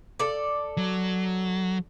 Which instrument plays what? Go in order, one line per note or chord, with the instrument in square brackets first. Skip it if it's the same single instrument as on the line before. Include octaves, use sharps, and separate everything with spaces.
[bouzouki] A4 D5
[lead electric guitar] F#3